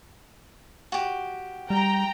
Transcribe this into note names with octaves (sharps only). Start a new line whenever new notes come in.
F#4 G4
G3 G5 A#5